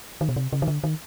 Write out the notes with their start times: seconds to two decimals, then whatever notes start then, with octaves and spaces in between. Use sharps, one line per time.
0.21 D#3
0.29 B2
0.36 C3
0.53 C#3
0.62 D#3
0.68 D3
0.84 D#3